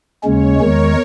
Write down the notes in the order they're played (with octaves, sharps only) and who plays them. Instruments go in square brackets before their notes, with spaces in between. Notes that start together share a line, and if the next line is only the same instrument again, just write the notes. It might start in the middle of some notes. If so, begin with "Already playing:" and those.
[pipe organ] D#2 C#3 G#3 C#4 [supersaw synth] C#5
[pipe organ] E2 D#3 G#3 [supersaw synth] A#4